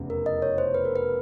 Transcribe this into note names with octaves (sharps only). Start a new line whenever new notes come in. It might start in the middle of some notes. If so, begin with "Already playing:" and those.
Already playing: F1 E2 C#3
A#4
D#5
C#5
C5
B4
A#4
B4